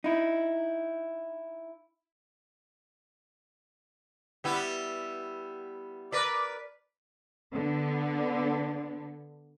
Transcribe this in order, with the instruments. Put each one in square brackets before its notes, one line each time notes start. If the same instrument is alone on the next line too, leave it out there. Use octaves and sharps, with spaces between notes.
[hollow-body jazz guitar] D#4 E4
[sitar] G3 B3 E4
[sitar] A#4 B4 D5 [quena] D6
[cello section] D3 B3